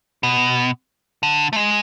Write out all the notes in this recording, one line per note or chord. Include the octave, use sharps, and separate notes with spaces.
B2
D3
A3
G#3